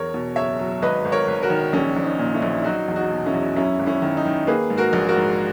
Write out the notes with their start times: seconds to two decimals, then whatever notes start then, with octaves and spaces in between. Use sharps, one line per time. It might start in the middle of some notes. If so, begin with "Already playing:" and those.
Already playing: E2 A#4 C#5
0.14 B2
0.36 F#1 C#5 E5
0.59 F#3
0.82 G#1 B4 D#5
1.05 G#1
1.12 A#4 C#5
1.28 G#1
1.43 F#4 A#4
1.50 D#3
1.73 A#1 C#4
1.96 A#1
2.04 D#4
2.19 A#2
2.34 C#4 E4
2.42 A#1
2.58 E4
2.64 F#3 D#4 F#4
2.88 E2
2.96 D#4 F#4
3.11 B2
3.26 C#4 E4
3.33 E2
3.56 F#2 C#4 E4
3.79 G#1
3.86 C#4 E4
4.02 D#3
4.17 D#4
4.25 D#3
4.47 A#3 G#4 B4
4.70 G#2
4.78 F#4 A#4
4.93 A#1
5.08 F#4 A#4
5.16 G#2